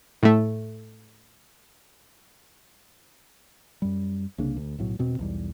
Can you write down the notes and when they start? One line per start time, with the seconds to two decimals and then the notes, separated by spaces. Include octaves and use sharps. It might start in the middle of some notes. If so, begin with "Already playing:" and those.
0.23 A2 A3
3.82 F#2 G3
4.38 C2 C#3 A#3 D4
4.57 D2
4.78 B1 A2 F#3
4.99 E1 B2 C4
5.19 B1 E2 G3